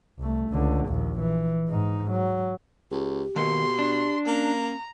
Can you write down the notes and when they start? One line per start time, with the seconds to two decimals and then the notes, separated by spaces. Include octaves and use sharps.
0.18 C2 A3
0.50 C#2 D3
0.88 A#1 D#2
1.19 E3
1.69 G#2 D#4
2.11 F#3
2.91 C#2 G4
3.36 B2 D#3 A#3 A4 C6
3.79 D4
4.26 A#3 C#4 A#5